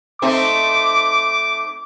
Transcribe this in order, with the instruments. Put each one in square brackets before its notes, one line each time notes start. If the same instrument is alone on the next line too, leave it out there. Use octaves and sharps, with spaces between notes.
[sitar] A3 C4 D#4 [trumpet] D6